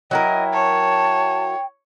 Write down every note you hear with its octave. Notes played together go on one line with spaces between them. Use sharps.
F#3 E4 A#4 D#5 G5
C#5 A5